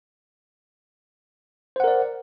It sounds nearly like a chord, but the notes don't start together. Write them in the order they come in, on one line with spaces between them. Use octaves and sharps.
C5 F#5 A#4 D5